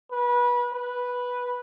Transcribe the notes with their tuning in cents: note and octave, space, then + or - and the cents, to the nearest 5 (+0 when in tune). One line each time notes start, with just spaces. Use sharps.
B4 -25
B4 -5